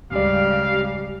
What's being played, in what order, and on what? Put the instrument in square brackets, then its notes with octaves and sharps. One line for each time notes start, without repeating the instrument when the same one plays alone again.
[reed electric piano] D2 D5 [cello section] G#2 C#3 G3 [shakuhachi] G4 [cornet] F5